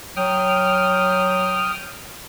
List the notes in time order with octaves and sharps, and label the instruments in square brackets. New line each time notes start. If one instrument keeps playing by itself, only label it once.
[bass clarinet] F#3 [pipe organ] G5 D#6 F6